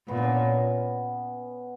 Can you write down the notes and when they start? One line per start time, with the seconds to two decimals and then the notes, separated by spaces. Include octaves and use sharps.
0.08 A#2 B3
0.17 D4
0.23 C#4